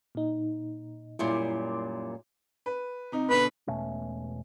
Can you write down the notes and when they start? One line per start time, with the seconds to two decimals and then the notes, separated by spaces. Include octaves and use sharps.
0.15 A#2 D#4
1.19 F#2 A#2 G3 E4 C6 D6
2.66 B4
3.12 C3 D#4
3.30 B2 D3 B4
3.67 E1 B2 A3 C#4